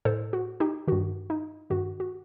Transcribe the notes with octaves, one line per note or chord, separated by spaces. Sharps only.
A2 A4 C5
F#4
D#4 G4
G2 D#3 F#4
D#4
G2 D#3 F#4
F#4